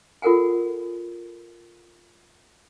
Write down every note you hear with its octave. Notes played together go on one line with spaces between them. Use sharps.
F4 A4 A#4 F#5 G#5